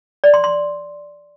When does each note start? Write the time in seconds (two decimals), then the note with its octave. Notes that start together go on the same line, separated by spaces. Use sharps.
0.24 D5
0.34 C6
0.44 C6